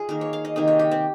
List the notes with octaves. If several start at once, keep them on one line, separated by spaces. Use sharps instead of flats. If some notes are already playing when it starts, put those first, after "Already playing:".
Already playing: F4 G#4
D#3 A#3 A#4
C#5
F5
D#5
C3 D#3 A#3 D#5
C#5
G4
C4